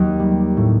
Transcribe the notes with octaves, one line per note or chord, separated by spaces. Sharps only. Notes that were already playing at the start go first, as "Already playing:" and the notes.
Already playing: D#2 F#3
G3
A2